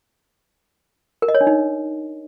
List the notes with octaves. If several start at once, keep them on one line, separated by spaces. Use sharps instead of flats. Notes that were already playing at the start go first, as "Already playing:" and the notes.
A#4
D#5
C#5
D4
D#4